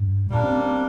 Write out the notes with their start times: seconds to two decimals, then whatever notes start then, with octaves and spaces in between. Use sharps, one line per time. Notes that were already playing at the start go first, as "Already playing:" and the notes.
Already playing: G2
0.30 A#2 G3 A#3 D4
0.43 C4
0.58 C4
0.71 C4